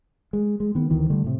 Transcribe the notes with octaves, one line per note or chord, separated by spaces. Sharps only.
G#3
G#3
D#3 B3
D2 D#3 E3
D3 G3 A3
A2 C3